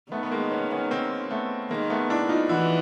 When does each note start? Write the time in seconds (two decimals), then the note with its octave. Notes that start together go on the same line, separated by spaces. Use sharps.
0.12 D#3 A3 B3
0.23 B3
0.32 G#3 A#3
0.52 B3 C#4
0.71 B3 C#4
0.91 A#3 C4
1.30 A3 B3
1.71 D#3 G#3 A#3
1.90 A3 B3
2.10 D4 E4
2.29 D#4 F4
2.49 E3 E4 F#4